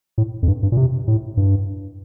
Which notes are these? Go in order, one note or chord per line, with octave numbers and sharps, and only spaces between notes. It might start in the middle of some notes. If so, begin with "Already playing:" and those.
A2
F2
G2
G2
A#2
C3
A2
G2